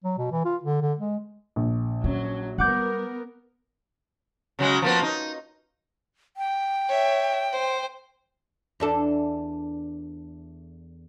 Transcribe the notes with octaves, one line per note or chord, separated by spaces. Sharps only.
F#3
B2
E3
F4
D3
D3
G#3
A#1
F#3 C#4
G3 B3 A#4 F#5 D6 G6
C#3 F#3 G#3
F3 A#3 B3
D#4
G5
C#5 E5
C5
E2 D4 A4